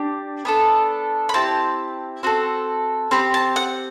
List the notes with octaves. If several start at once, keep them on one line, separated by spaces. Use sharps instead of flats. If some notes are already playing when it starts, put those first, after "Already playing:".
Already playing: D4 G4
B3 D4 A4
B5
C4 E4 G4 A5
C4 F#4 A4
C4 G4 B5
A5
F#5